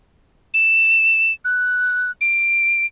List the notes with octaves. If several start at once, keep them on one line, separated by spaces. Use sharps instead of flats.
E7
F#6
D7